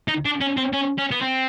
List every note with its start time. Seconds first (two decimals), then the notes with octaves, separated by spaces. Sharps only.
0.08 D#4
0.25 D4
0.41 C#4
0.57 C4
0.73 C#4
0.98 C#4
1.11 B3
1.21 C4